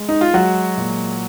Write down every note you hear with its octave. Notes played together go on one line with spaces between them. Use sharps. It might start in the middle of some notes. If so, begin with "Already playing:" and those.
Already playing: G#3
D#4
F4
F#3 G#3 F#4
A#2